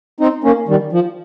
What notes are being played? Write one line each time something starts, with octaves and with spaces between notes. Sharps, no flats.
C4 D#4
A#3 C#4
D#3 G3
F3